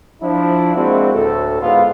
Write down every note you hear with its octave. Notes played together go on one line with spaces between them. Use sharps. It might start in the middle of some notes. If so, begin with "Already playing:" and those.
F3 D4 E4
G#3 A#3 C4 D4 E4 F#4
D2 A2 A4
G#2 B3 E4 F4